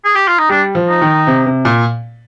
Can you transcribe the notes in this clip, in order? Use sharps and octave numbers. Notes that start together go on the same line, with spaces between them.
G#4
G4
F4
D#4
G3 D4
F3
D#4
D#3
C3
C3
A#2